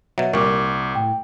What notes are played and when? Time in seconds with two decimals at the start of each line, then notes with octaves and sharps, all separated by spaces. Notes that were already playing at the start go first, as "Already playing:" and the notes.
0.18 B2 F#3 E5
0.34 C2 A#2 G3 A#4 C#6 D6
0.95 A2 G5